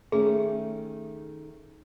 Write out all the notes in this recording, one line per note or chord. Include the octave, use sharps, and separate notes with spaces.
D#3 A3 C#4 G#4